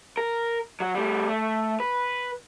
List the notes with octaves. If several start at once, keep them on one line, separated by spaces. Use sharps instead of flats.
A#4
F#3 F#4
G3 A3
A3
B4